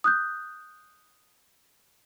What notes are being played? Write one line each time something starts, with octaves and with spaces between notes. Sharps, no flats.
D#6 F#6 G6